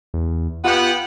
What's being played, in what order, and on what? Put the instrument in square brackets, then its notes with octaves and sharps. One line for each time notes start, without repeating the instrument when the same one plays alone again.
[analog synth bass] E2
[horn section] B3 G4 F#5 [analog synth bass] F4